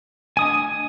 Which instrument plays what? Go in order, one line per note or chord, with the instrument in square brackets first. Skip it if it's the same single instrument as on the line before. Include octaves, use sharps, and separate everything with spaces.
[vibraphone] A3 D4 D#5 [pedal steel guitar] G#5 D#6